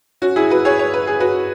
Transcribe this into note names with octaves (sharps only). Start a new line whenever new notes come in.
C#4 F#4
E4 G#4
F#4 B4
G#4 C#5
C#5
B4
G#4
F#4 B4